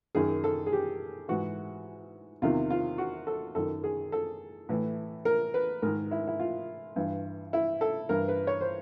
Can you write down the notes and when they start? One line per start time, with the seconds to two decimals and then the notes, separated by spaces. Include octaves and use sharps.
0.15 F#2 D#3 G#4
0.44 A4
0.66 G#4
0.72 G4
1.28 G#2 E3 F#4
2.42 E2 C3 D#3 F4
2.70 F4
2.98 F#4
3.27 A4
3.55 F#2 D#3 A4
3.84 G#4
4.12 A4
4.69 A2 E3
5.25 A#4
5.54 B4
5.82 G#2 D#3 A#4
6.11 E4
6.27 E4
6.39 F4
6.96 G2 E3
7.53 E4
7.81 A4
8.09 G2 E3 A#4
8.28 B4
8.47 C#5
8.61 C5